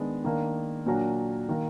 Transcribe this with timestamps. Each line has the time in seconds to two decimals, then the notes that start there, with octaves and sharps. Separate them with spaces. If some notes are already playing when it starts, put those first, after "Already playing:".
Already playing: D#3 G#3 B3 D4
0.24 D#3 A#3 D4
0.86 A#2 F#3 D4 F#4 A#4
1.49 D#3 A#3